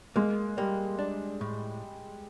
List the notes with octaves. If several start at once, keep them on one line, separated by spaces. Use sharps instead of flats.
G#3 A#3
G3 A#3
D4
A2